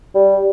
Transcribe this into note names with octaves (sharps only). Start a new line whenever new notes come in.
G3